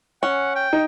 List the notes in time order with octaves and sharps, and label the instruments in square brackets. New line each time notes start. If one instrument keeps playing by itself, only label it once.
[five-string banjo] C#4 [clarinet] F#5
[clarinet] G5
[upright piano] D#4